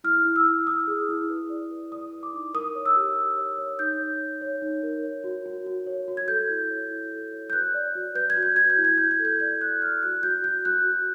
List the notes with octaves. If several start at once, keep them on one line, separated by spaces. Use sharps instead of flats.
E4 F6
E4
E6
E4
E4 D#6
G#4
E4
B4
D5
B4
D5 D#6
B4
D6
D#4
A#4 D#6
C#5
E6
G4
G4
C#5
C#5
D#4 G6
C#5
C#5
C#5
D#4
A#4
C#5
F#4
F#4
F#4
C#5
F#4
G#6
A4 G6
E4
C#5
E4
A4
C#5
G6
B4 F#6
D5
F#4
B4 G6
G#6
F#4
G6
F#4 G#6
G6
E4
G#6
E4 G6
G#6
A4
G6
D5 G6
E4 F#6
D5 F6
F#4 F#6
F#4 G6
F#4 G6
F#4 F#6
F#4